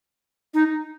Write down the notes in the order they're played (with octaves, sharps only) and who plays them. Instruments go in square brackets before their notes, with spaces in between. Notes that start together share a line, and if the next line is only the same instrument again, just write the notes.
[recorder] D#4